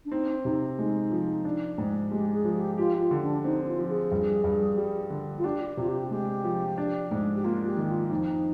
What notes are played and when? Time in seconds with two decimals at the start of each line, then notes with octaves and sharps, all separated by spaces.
0.05 D4
0.11 C4 D#4
0.45 C3 D#4
0.79 G#3 D#4
1.12 F3
1.45 D4
1.78 G#2
2.11 G#3 G4
2.29 G4
2.34 G#4
2.44 F3
2.56 G4
2.78 F4 G4
3.00 F4
3.11 D3
3.23 D4
3.44 C4 D#4
3.67 F4
3.78 F3
3.88 G#4
4.11 G2
4.44 G2
4.77 G3
5.10 D3
5.39 F4
5.44 D4 G4
5.77 C3 F4
5.88 G4
6.11 G#3 G4
6.44 F3
6.78 D4
7.11 G#2
7.35 G4
7.44 A#3 F4
7.66 G4
7.77 D#3
7.88 F4
8.10 F2 D#4